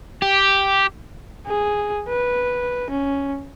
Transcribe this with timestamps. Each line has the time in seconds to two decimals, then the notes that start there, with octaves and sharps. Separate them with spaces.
0.22 G4
1.47 G#4
2.09 B4
2.91 C#4